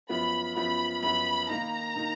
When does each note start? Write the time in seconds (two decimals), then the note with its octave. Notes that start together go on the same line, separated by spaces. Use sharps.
0.09 F#2 F3 B3 B5
0.56 F#2 F3 B3 B5
1.03 F#2 F3 B3 B5
1.49 D#3 A#3 D#4 A#5
1.96 D#3 A#3 D#4